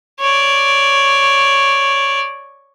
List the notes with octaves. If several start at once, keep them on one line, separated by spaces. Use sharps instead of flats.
C#5 D5